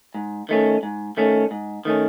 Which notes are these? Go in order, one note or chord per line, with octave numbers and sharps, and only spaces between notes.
G#2
D#3 A3 C#4
G#2
D#3 A3 C#4
G#2
D#3 A3 C#4